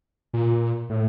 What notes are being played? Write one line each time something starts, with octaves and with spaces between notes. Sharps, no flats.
A#2
A2